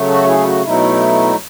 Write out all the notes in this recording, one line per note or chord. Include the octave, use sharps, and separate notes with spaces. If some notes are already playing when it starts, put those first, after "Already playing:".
Already playing: C#3 F#3 A3
F#4 A4
E4 G#4
E4
F#4
B2 F#3 A3 D#4 E4